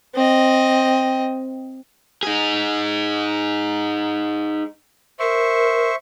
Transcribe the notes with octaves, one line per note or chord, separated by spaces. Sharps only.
C4 D#5
D#4 G#4
A#4 C5 E5 C#6